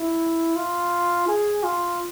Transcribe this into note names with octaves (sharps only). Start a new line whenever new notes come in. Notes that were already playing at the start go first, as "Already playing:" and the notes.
Already playing: E4
F4
G#4
F4